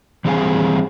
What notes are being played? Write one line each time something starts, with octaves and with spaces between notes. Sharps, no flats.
E3 G3 C4 G#4 F5 G#5